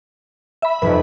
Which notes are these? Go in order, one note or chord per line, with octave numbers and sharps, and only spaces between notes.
E5 B5
F1 F2 B4